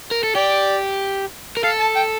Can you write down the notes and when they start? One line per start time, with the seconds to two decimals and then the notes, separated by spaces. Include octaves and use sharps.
0.11 A#4
0.23 A4
0.35 G4 D5
1.57 A#4
1.64 A4 F5
1.80 A5
1.96 G5